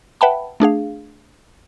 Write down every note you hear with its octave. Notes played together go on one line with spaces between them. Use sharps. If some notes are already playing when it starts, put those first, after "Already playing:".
B4 E5 F#5 G5 A5 B5
A3 D4 G#4 F5